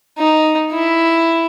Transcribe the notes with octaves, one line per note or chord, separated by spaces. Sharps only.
D#4
E4